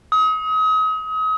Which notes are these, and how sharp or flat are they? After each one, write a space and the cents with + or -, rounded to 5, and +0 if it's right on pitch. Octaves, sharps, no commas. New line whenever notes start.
D#6 +35